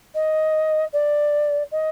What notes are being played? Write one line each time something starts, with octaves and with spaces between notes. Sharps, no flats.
D#5
D5
D#5